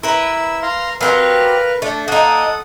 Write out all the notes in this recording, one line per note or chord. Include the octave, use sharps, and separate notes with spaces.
E4 A#4 B4 E6
F5 A#5 C6
F#3 C4 G4 A#4 B4 F5
A3 D4
A#3 D#4 A4 F#5 D#6